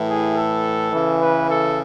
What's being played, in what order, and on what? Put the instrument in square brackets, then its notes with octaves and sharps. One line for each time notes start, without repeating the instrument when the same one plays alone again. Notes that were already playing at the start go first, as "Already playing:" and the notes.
Already playing: [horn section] A2 E3
G#4
A4
C#3 E3
B4
A4